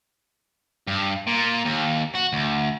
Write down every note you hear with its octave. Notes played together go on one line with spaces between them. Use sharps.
G2
A#2
D#2
F#4
D2